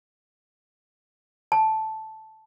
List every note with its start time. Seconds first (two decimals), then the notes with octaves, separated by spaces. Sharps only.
1.52 A5